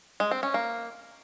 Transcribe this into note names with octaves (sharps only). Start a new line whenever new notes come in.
G#3
C4
C#4
A#3